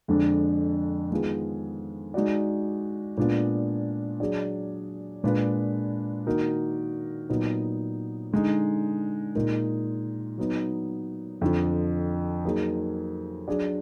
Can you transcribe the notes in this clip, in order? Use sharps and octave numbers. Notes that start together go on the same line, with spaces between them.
F2 D3 G#3 D4
D#3 G#3 B3 F4 G#4
G#3 D#4 F#4 D5
A#2 G#3 B3 D4 F4
F#3 D4 G#4 D5
A#2 G#3 D4 F4 B4
D#3 A#3 D#4 F#4 A#4
A#2 F#3 B3 D#4
D3 G#3 D#4
A#2 G#3 D#4 A#4
F#3 B3 D#4
F2 D3 F3
F#3 A#3 D#4 G#4
F#3 D4 G#4 D5